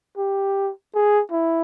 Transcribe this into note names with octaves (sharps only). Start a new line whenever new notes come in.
G4
G#4
E4